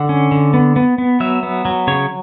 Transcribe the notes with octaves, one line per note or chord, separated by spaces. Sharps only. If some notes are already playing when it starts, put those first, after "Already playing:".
Already playing: D3 F#5
C#4
D3
B3
B3
B3
F#3 E5
B3
F#3
C#3 C#5